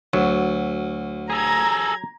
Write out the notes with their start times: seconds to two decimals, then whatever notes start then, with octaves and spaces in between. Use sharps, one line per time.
0.13 D2 F#3
1.30 G#4 A4 A#5 G#6